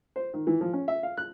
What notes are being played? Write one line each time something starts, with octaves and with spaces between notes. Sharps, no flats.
C5
D#3
E3
F3
C#4
E5
F5
F#6